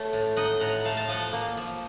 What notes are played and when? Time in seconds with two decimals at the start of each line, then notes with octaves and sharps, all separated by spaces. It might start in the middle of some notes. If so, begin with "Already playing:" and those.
Already playing: A3 C#5
0.13 A2
0.36 D#4 D#5 F#5
0.60 A2 F#5 A#5
0.85 A3 F5 A5
0.97 A5
1.08 F3 D#5 F#5
1.33 A#3
1.57 F3